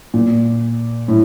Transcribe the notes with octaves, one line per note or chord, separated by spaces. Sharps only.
A#2
A2